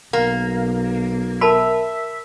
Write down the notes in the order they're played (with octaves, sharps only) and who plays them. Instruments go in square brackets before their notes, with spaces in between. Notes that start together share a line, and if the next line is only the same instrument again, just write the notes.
[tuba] B1 [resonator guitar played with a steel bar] A#3
[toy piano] A#4 A5 B5 [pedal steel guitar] E5